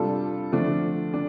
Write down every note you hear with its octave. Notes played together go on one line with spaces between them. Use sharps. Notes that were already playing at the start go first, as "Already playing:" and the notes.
Already playing: C3 G3 D4 F4 A4
D3 F3 A3 D4
D4